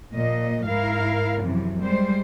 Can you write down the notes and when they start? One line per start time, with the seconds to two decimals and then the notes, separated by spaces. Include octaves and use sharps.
0.13 A#2 F3 D#5
0.66 G#2 E4 A#4 F5
1.41 F#2 C3 E3 F3
1.82 G3 G#3 C5